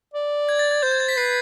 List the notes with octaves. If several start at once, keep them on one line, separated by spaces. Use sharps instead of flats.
D5
G#6
A6
G#6
C5 G6
G#6
A6
B6
B4 C7